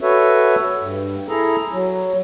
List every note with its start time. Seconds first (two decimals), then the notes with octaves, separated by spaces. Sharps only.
0.01 F#4 A4 B4 C#5 E5
0.81 G2
1.29 E4 G#4 A4 A#5
1.72 F#3